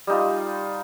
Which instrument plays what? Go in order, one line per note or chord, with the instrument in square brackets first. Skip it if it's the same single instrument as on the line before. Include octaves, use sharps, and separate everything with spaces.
[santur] G3 D#4 F4